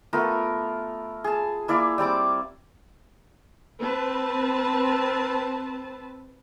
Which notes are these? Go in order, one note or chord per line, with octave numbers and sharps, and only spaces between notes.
A3 B3 F4 A#4
G#4 A5
A#3 E4 D5 F5
G3 C4 D5 D6
C4 B4 A5